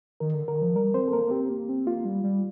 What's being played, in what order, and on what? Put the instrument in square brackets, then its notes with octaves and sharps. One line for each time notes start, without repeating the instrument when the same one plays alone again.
[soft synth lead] D#3 [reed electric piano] A#4
[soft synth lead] D3
[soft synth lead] D3 [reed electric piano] A#4
[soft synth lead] D#3
F3
[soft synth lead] G3 [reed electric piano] A#4
[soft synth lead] C4 [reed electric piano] C5
[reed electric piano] A4
[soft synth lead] A#3 [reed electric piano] A#4
[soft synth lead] A#3
[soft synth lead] C4 [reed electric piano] G4
[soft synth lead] A#3
C4
[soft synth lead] A#3 [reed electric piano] F4
[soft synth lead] G3
G3